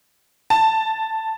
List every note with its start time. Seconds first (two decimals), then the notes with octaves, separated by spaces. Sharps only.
0.50 A5